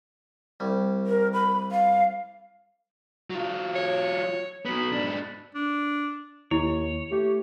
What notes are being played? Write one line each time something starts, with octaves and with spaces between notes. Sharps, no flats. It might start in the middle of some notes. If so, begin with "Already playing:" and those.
C2 G3
A#4
B5
F5
F#3 F4
C#5
F#3 B3 B5
G#2 D4
D4
D#2 E4 C#5
A3 G4